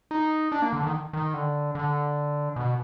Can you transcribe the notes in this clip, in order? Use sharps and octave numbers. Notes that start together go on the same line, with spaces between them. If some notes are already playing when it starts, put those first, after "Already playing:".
D#4
D4
A#3
D3
D#3
D#3
D3
D3
B2